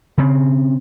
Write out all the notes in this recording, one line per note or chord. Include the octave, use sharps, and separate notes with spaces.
C#3 C4